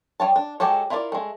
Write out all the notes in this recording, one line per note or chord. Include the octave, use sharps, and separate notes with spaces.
G3 C#5 A5
D4
G#3 F#4 G4 A4 C#5
E4 F4 A#4 C#5 D5
G#3 A3